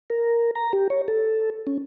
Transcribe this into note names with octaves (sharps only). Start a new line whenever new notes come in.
A#4
A#5
G4
C#5
A4
C#4